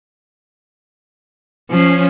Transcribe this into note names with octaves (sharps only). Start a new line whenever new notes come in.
F3 C#4